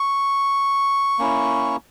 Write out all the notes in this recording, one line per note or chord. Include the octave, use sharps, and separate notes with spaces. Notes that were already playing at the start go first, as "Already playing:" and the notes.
Already playing: C#6
A#3 C#4 E4